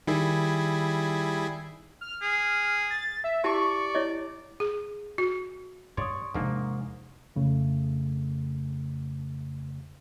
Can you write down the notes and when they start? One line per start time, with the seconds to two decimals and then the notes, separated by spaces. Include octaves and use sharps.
0.07 D#3 G3 E4 G#4
2.01 F6
2.22 G#4
2.90 A6
3.24 E5
3.44 E4 G4 D5 A5 C#6
3.95 E4 C#5 D#5
4.60 G#4
5.18 F#4
5.97 G2 C#5 D5 C6 C#6 D#6
6.35 E2 G#2 C3 F3 A#3 D4 D#4
7.36 F2 C#3 A3